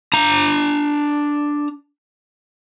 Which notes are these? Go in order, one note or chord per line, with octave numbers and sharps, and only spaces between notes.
D4 A#5